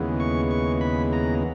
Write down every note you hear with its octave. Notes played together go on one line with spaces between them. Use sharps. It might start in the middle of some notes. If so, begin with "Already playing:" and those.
Already playing: D#2 C#3 E3 G#3 B3
C#6
C#6
B5
A#5